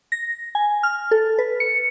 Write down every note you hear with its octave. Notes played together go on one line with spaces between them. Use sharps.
A#6
G#5
F6
A4
B4
C#7